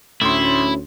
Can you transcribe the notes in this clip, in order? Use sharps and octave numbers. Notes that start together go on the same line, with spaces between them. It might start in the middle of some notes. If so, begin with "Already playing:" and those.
D2 A2 C#4 E4 C6